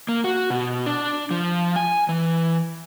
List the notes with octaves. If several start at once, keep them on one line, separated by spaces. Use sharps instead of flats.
A#3
F#4
B2
D4
F3
G#5
E3